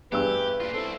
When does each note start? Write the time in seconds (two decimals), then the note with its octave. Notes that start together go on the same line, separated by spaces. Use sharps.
0.12 E2 G2 G4 B4 E6
0.60 A#2 F4
0.74 C4 E4 A4